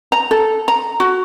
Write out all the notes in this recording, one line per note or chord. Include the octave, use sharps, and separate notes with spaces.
A#5
A4
A#5
F#4